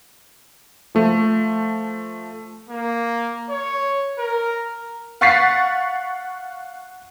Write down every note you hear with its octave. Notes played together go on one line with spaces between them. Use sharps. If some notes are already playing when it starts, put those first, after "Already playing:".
F3 A3
A#3
C#5
A#4
F5 F#5 C#6 A6 B6 C7